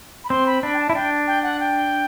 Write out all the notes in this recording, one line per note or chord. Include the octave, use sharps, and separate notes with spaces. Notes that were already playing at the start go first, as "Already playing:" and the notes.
B5
C4 C6
B5
D4 B5
G5
A5
E4
D4 G5
G5
F#5
G5